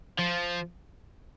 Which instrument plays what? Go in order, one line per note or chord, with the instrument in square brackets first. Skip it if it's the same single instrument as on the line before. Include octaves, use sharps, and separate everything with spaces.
[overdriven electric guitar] F3